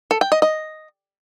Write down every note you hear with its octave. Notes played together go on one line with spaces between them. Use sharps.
A4
G5
D#5
D#5